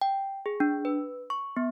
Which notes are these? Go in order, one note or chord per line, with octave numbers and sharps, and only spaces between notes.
G5
G#4
D4
B4
C#6
B3